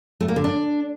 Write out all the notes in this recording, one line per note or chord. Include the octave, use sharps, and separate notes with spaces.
A3
A#3
D3
D4